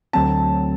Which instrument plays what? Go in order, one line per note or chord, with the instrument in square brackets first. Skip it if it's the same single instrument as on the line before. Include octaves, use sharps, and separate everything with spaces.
[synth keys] D2 D3 F#3 C4 [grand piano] A5